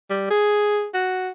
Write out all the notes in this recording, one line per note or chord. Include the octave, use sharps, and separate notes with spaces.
G3
G#4
F#4